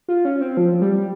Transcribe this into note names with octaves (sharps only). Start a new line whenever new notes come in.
F4
C#4
C4
F3
G3